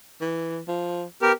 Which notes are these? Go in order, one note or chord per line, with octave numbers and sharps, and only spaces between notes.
E3
F3
B3 G4 A#4